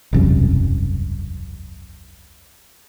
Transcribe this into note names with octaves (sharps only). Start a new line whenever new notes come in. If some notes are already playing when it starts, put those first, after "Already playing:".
E1 C2 F#2